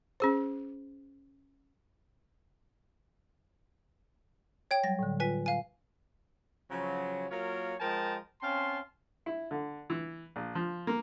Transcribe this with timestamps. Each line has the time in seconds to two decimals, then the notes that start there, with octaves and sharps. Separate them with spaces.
0.20 C#4 G#4 C5
4.71 C#5 G5 G#6
4.84 F#3 G3 A#6
4.99 A2 D3
5.20 F4 B4 G#5 B6
5.46 F5 G#5
6.70 C#3 F3 F#3
7.30 F#3 A#3 F4 A#4 C#5
7.80 F3 G#3 A#4 G5 A5
8.41 C4 C#4 F5 A5 C6
9.26 E4
9.51 D3
9.90 E3
10.36 A#1
10.55 F3
10.87 A#3